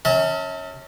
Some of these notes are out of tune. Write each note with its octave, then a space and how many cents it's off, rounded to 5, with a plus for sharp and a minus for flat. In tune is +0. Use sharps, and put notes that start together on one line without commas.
C#4 +0 E5 -40 A5 +40